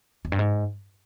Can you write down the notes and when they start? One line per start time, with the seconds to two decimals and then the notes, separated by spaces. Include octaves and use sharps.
0.25 E2
0.32 G2
0.39 G#2